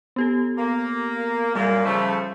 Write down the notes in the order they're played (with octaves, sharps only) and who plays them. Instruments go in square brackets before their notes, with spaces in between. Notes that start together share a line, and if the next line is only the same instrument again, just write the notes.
[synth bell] B3 G4 A4
[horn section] A#3
[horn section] F#2 A#2 A#3 [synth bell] G3
[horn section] C#3 F3 A3